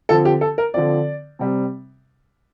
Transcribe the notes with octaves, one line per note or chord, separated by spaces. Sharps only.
D3 F3 C4 A4
G4
A4
A#4
D3 F3 C4 D5
C3 G3 C4